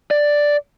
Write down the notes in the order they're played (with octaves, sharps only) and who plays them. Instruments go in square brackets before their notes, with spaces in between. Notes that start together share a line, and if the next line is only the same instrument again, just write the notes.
[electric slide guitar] D5